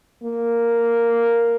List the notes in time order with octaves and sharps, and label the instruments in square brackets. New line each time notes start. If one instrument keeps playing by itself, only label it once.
[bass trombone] A#3